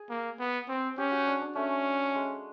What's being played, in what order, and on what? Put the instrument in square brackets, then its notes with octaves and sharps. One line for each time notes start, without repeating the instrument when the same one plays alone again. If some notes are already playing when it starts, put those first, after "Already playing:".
Already playing: [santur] G#4
[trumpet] A#3
B3
C4
[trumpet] C#4 [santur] G4
[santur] F#4
D4
D4
[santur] A3 [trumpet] C#4
[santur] G#3